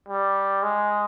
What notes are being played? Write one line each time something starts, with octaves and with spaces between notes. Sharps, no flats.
G3
G#3